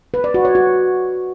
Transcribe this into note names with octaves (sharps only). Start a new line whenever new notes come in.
B4
D5
F#4
C#5
F#4